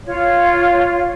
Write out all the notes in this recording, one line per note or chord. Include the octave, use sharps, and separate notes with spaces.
F4 C#5